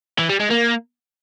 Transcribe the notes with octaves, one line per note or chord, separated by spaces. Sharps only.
E3
G3
G#3
A#3